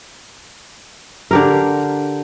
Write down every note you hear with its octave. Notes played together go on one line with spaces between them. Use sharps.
D3 G4 A#4